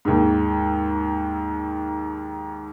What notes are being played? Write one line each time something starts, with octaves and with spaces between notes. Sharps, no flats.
D#2 G#2